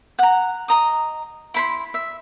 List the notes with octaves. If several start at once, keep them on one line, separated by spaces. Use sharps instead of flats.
F#5 A#5
D#5 A#5 D#6
E4 B5 C6
E5